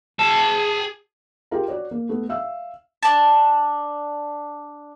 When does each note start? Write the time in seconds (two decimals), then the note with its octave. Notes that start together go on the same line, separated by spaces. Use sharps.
0.19 G#4 A5
1.51 F4 G4 G#4 A#4 G5 A#5
1.68 F#4 C#5 D5
1.91 A#3
2.09 A3 B3
2.29 E5 F5 E6
3.03 D4 A5